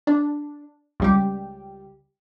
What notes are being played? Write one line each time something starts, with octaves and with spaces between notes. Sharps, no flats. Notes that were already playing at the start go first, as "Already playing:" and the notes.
D4
C#2 G3 G4